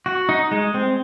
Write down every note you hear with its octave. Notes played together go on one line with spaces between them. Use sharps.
F#4
D#4
G#3
C4